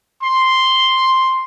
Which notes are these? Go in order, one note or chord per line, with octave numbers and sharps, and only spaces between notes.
C6